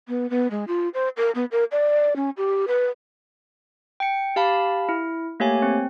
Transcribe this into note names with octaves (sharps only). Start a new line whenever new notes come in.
B3
B3
G#3
F4
C5
A#4
B3
A#4
D5
C#4
G4
B4
G5 C#7
G4 F5 A5 B5
E4
A3 A#3 G4 C#5 G#5
C4